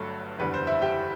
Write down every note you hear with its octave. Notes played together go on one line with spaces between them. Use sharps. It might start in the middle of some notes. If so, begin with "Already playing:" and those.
Already playing: G1 G2 D3 F#3 A3 A4
F#1 E2 D3 G3 B4
C5
E4 E5
G4 G5